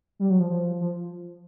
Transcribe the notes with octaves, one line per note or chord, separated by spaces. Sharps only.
G3
F#3
F3
F3
F3